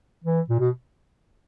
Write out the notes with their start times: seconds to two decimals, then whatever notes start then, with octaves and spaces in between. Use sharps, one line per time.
0.24 E3
0.49 A#2
0.60 B2